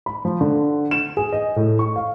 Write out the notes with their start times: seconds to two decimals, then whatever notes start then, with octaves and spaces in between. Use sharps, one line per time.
0.06 B5
0.25 F3
0.41 D3
0.91 E7
1.17 G#4
1.33 D#5
1.56 A2
1.79 C#6
1.96 F5